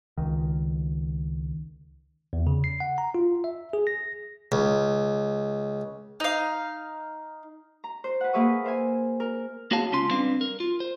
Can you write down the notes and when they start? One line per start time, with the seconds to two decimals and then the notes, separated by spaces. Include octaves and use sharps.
0.17 C#2 D#3
2.33 E2
2.47 C#3
2.64 C7
2.80 F#5
2.98 A#5
3.15 F4
3.44 E5
3.73 G#4
3.87 A#6
4.52 C#2
6.20 D#4 F5
7.84 A#5
8.04 C5
8.21 B4 F#5
8.33 A#3 G#4 B4 E5 C#6 D#6
8.64 A#4 C5 E5 G#5
9.20 A#4
9.71 A#3 F#4 G#4 C#5 F5 A5
9.92 C#2 C#4 F4 C6
10.11 G3 C4 D4 B4 F5
10.41 A#4
10.60 F4
10.80 C5